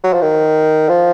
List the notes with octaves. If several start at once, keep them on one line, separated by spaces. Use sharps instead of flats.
F#3
F3
D#3
F3